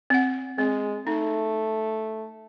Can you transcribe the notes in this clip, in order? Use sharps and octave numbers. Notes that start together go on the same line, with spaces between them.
C4 F#5
G#3 C4
A3 D#4